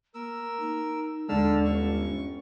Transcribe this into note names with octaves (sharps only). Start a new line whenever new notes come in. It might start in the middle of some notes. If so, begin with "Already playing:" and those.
A#3 A#4 E6
D#4
D#2 D3 G#3 D4 A5 E6 F6
G1 C#4 C#6